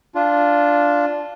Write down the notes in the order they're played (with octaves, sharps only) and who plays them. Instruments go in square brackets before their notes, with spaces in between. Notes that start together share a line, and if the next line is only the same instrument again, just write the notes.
[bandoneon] D4 F4